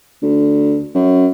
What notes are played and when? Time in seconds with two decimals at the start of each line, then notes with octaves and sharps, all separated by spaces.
0.22 D2
0.95 F#2